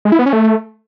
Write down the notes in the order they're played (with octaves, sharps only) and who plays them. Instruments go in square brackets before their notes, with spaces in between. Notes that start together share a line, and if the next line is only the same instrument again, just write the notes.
[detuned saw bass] G#3
E4
B3
C#4
A3